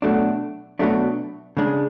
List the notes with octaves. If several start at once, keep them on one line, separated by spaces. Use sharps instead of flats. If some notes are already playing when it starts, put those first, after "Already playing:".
B2 F#3 A3 D4
B2 F#3 A3 D4
C#3 G#3 D4